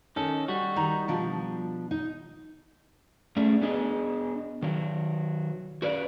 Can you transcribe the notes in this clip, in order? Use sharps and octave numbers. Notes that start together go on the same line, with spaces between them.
D#3 C#4 A4 D#5
G3 F#4
D#3 D#4 A#5
B2 F3 D4
D#4
A3 C#4 D4 G#4
B3 D4 G#4 D#5
D#3 F#3
F#4 B4 D5